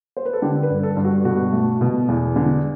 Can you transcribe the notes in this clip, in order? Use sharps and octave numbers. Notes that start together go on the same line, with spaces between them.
C5
B4
A4
D3 G4
B4
G2
A4
G2
F#4
B2 F#4
A3
B2
E2
D3